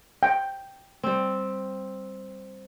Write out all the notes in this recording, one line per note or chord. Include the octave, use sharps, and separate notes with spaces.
G5
G3 C4